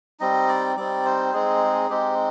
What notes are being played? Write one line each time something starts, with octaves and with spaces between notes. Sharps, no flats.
G3 C4 D#4 D#5
D5
G3 C4 D#4 D5
C5
G#3 C4 D#4 G#4
G#3 C4 D#4 G4